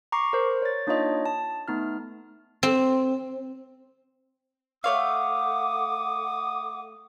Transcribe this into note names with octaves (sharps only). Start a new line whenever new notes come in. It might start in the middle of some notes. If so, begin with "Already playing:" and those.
A#5 C#6 D6 C7
A#4 C5
C#5 A6
A#3 D4 D#4 F4 C#5 D#5
A5
A3 B3 D#4 F6
C4
A3 A4 C#5 F5 F#5 D6 D#6